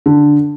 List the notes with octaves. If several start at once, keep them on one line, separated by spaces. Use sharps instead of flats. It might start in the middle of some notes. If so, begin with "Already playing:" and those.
D3